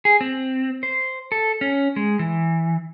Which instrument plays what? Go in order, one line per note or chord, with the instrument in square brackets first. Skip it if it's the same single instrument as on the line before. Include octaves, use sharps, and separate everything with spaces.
[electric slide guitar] G#4
C4
C5
A4
C#4
G#3
E3